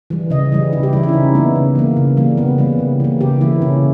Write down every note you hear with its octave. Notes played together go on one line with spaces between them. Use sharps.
E3 G3
C#3 D#5
E3 G3
C#3 E4
G4
E3 G3 E4
E4
C#4
C#3 D#4
E3 G3 A#3 B3
C#3
E3 G3 A#3
C#3
E3 G3 A#3
C#3 B3
E3 G3 A#3
C#3
E3 A#3
C#3 G4
E3 A#3 E4
C#3 C#4